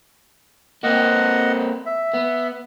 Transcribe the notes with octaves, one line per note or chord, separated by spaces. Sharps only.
A#3 C4 D#5 F#5
E5
B3